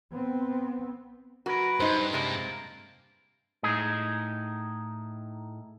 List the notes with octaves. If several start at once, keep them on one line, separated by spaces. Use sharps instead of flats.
B3 C4
F#3 F#4 A#4 B4
G2 D#4 C5
C3 G#3 A#3 C4 F4 A#4
A2 D#4 G#4